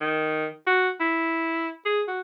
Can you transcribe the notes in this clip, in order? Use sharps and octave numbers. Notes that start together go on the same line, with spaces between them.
D#3
F#4
E4
G#4
F#4